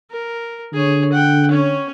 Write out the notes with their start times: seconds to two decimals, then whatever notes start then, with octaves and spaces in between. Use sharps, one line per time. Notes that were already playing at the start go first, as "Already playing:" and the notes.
0.11 A#4
0.74 D3 G#4 C#5
1.13 F#5 G5
1.51 C#4 C#5